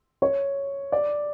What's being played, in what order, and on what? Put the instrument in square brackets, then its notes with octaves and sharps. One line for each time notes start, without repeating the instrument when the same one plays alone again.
[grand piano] C#5
D5